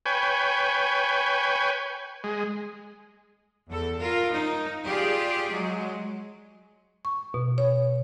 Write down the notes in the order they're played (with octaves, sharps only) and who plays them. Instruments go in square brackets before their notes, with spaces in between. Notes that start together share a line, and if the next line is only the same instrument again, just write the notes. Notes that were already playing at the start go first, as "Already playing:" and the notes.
[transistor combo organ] B4 C#5 G5 G#5
G#3
[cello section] E2 A4
F4 A#4
D#4
F4 G4 G#4 D5
F#3 G#3
[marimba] C#6
B2
C#5